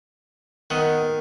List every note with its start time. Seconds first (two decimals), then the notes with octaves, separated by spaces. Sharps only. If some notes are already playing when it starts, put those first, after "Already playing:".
0.70 D#3 B3 D#5 F#5